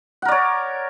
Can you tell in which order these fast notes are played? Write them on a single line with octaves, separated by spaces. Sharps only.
F#5 A#4 D5 C#5